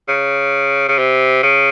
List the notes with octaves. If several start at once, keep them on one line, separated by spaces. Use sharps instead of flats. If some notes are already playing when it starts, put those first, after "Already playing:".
C#3
C#3
C3
C#3